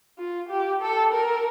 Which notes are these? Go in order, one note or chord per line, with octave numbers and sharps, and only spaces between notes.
F4
G4
A4
A#4